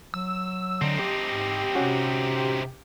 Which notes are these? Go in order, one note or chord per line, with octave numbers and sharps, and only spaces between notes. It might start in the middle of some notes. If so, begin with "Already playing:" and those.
F#3 E6
D3 C4 D#4
G4
G#2
C3 C#4 F#4